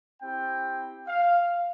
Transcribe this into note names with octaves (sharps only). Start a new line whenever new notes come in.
C4 E4 G4 G5
F5